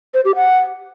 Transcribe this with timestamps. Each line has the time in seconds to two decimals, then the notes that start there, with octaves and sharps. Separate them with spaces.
0.14 C5
0.25 G4
0.36 F#5